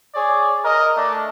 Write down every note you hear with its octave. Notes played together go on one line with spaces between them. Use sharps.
G#4 C#5 D5
A#4 D#5
A3 D4